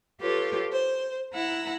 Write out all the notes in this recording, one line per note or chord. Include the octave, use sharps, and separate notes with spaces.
F4 G4 A4 B4 C#5
C5
E4 F#5 A#5 E6